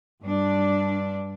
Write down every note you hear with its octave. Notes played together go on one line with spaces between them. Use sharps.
G2 D4